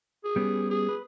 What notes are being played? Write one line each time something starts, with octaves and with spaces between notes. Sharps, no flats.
G#4
G3 B3 C#4
G#4
B4